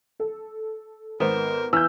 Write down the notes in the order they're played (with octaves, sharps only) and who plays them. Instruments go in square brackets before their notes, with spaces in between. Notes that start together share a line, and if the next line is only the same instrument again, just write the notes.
[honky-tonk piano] A4
[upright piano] G#1 C5 [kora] B3 [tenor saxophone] A#4
[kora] E3 [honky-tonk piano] E6 F6 G6